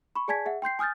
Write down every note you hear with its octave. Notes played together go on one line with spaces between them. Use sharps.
B5 C#6
G#4 D5 G#5 A5 G#6 B6
G#4 E5 F#5
G5 C6 G6 C7
G#5 D#6 F6 G6 A6